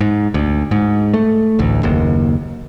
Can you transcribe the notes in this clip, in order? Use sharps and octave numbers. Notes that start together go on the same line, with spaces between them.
G#2
D2
G#2
A3
A1 D2
F#1 D#2